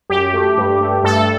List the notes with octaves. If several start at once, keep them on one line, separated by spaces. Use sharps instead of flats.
F#2 G4
A3
G2
A3
G2 A4